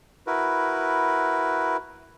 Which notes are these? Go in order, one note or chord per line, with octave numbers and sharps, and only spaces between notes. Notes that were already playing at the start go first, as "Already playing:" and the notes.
E4 F#4 A#4 B4